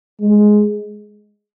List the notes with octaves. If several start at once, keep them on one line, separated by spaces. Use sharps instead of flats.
G#3